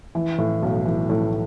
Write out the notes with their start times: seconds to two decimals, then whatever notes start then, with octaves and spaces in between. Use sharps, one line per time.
0.15 E3
0.38 A2
0.62 B1
0.85 E3
1.10 A2